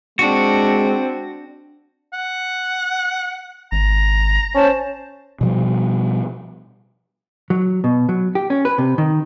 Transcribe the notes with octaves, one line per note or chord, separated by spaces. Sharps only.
G#3 C4 D4 F#4
F#5
G#1 A#5
C#4 C5 A5
B2 F3 G3
F#3
B2
F#3
G4
C#4
B4
C3
D#3